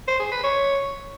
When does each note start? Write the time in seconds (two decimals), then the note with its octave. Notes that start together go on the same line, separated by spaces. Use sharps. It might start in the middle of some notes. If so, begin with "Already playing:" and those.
0.08 C5
0.20 G#4
0.32 B4
0.43 C#5